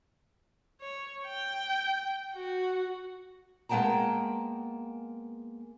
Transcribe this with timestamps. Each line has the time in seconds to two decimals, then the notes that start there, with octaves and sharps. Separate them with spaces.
0.81 C#5
1.26 G5
2.34 F#4
3.69 G#3 A#3 B3 G5 A5 A#5